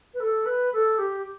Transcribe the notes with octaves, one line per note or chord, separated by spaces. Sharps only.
B4
A4
B4
A4
G4